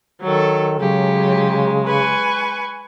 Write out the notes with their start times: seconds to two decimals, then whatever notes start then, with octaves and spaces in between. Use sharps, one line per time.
0.22 D#3 F#3 A4
0.79 C#3 F#3 G#3 G4
1.85 B4 G#5 C#6